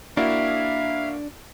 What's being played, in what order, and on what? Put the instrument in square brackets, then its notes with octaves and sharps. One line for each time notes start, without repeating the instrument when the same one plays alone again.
[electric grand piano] A#3 E4 F#4 [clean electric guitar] D4 [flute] E5 [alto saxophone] F5